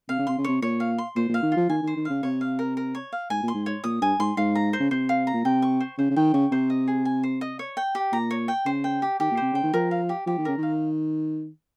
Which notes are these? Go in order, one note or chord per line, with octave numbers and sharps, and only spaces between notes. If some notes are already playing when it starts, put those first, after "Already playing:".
C3 F5
C#3
C3 C6
C#3
C3 C#5
A#2 C#5
F5
C6
A#2 C5
A#2
F5
D#3
F3 F4
D#3 G#5
D#3
C5
D#3
C#3 F5
C3 C#5
F5
A#4
A#4
C#5
F5
G#2 G#5
A#2
C6
G#2
C#5
A#2 D#6
G2 G#5
G#2 C6
G#2 F5
A#5
C5
C#3
C3 C5
F5
A#5
A#2
C3 G5
C#6
C5
C#3 C5
C#3
D#3 G5
C#3 C#6
C3 C5
D#5
G#4
G#5
C5
D#5
C#5
G5
G4
A#2 A#5
C#5
G5
C#3 C5
G5
G4
D#3 G4
A#2
C3 C5
C#3 G5
D#3
F3 A#4
F5
G4
F3 G4
D#3
C#3 A#4
D#3 F5